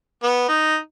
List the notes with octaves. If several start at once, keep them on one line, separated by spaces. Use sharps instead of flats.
B3
D#4